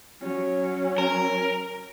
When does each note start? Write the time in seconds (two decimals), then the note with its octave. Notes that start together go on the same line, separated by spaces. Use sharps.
0.21 F#3 C#4
0.98 A#4